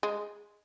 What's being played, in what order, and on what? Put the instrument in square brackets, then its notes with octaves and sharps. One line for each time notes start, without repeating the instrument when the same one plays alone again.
[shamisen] G#3